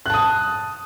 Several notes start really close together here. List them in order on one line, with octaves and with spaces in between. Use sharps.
F#6 A5 D#6